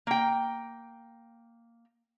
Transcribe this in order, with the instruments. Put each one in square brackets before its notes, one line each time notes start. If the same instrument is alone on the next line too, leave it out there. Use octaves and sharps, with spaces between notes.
[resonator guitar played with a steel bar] A#3 G5